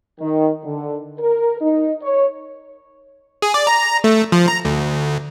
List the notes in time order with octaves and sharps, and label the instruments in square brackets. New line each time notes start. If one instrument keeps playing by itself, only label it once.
[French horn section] D#3
D3
A#4
D#4
C#5
[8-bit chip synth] G#4
D5
A#5
A3
F3
A#5
D2